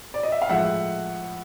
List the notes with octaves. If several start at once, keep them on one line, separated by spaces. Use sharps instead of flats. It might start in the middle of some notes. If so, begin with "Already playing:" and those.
D5
D#5
E5
F5
A2 F3 G#3 E5 F#5